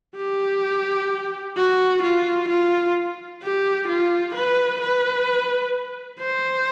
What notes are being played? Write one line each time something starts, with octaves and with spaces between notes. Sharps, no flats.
G4
F#4
F4
F4
G4
F4
B4
B4
C5